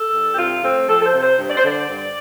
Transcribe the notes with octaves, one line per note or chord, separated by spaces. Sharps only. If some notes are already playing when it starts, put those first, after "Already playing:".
Already playing: A4
G2
G4
C3 F4
A3 C4
F3 A4
A4
C5
C3
C5
G2
D5
C5
D3 D5
G2